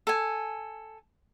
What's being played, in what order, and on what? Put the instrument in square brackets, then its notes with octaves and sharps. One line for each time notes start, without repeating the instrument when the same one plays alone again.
[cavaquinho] A4 G#5